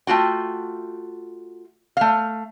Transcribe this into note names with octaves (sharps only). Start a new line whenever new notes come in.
A3 F4 F#4 G5
A3 F5